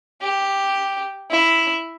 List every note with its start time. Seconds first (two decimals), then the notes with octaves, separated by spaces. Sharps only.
0.22 G4
1.31 E4